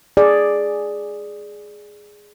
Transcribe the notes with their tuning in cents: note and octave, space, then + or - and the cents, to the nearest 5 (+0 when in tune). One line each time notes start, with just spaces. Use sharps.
G#4 +0 D5 +5